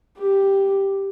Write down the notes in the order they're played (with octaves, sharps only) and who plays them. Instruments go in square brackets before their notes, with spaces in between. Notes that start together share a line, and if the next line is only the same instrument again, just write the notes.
[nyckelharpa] G4